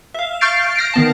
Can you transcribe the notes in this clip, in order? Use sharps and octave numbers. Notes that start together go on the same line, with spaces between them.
E5 F5
C#6 F6 G6 A6 C7 D7
F6 A#6 C7 D7
D#3 B3 A5